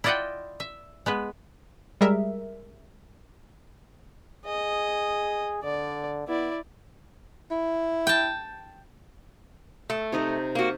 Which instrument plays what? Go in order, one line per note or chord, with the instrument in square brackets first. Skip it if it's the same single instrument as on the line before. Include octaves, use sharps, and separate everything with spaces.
[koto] E4 F4 D5 D#5 F#5 G5
E5
G#3 B3 B4
[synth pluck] G3 G#3 G#4 A#4 E5
[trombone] G#4 [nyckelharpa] D#5
[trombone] D3 [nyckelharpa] D5
[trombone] B3 [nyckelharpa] E4 D5
[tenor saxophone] E4
[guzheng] G5 A5
[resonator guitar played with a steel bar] A3
[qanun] C3 D#4 D#5
[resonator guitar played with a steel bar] A#3 F#4